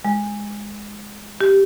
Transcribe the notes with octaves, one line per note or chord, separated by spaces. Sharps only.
G#3
G4